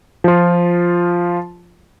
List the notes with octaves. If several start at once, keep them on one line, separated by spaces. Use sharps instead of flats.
F3 F4